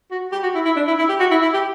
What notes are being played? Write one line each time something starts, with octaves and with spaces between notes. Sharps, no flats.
F#4
G4
F#4
E4
E4
D4
E4
E4
G4
F#4
E4
E4
G4